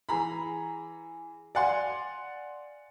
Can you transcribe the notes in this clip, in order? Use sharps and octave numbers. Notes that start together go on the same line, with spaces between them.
E3 G#4 A#5 B5
D5 F5 F#5 G#5 C6